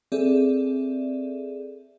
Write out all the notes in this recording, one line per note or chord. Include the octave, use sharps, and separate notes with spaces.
C4 G#4 A4 D5 E5